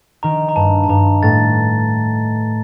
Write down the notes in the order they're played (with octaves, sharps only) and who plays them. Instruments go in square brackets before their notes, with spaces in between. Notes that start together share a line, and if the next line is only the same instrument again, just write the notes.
[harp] D#3 [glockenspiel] A#5
[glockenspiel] A#5
[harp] G2 [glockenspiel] A5
[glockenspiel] A5
[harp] G2 [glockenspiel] A#5
[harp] A2 [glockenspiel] A6